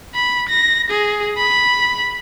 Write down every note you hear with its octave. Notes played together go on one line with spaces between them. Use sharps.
B5
A#6
G#4
B5